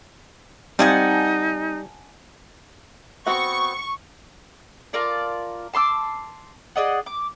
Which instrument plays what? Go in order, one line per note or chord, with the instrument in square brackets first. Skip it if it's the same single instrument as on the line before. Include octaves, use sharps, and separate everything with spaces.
[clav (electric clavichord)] G3 [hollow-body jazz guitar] C4 D#5 F5 [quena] D#4 [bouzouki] F#5 G#5 A5
[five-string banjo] B3 C4 F#4 [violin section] C#6
[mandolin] F4 A#4 D5 A5
A5 C6 D6 E6
G#4 D5 D#5 F#5
D6